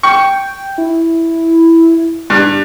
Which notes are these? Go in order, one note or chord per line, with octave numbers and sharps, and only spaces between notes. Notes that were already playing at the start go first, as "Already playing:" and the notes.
G5 C#6
E4
G2